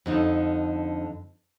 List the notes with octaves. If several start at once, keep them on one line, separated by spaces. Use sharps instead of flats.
F2 D3 D#4